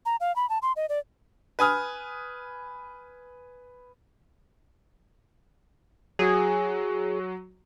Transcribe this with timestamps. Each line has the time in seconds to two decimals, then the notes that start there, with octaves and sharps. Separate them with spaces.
0.06 A#5
0.20 F5
0.36 B5
0.49 A5
0.62 C6
0.76 D#5
0.89 D5
1.59 B4 G#5 D#6 F6
6.19 F#3 F#4 G#4